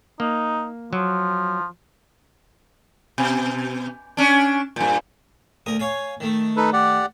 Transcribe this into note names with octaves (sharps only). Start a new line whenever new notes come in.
A#3 D#4
F3 F#3
B2
C#4 D4
G2 A#2
D2 A#4 D#6
C#5 F5 G#5
D#3 A3
D#4 A4 B4
G4 D5 F#5